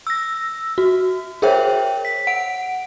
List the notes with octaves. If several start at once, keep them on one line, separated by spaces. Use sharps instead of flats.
E6 A#6
F#4
G#4 A#4 C5 C#5 E5 G5
B6
F#5 D7